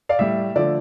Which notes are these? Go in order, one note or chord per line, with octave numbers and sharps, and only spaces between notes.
D5 F5
A2 G3 E5
D3 F3 A3 D5